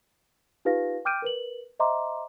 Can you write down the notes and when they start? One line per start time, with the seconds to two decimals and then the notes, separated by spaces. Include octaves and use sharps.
0.65 D#4 F4 G4 B4 F5 A#6
1.05 G5 D6 F6 G6 D7 D#7
1.22 A#4 B4 F#7
1.79 C5 D#5 E5 A#5 C6 D6